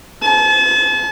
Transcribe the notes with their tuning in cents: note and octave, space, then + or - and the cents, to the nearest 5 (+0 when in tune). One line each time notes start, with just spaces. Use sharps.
A5 -35